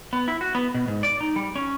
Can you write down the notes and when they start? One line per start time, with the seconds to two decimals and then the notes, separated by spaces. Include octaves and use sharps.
0.13 B3
0.28 E4
0.41 F#4
0.55 B3
0.74 B2
0.88 G#2
1.03 D5
1.21 D#4
1.36 G3
1.56 C#4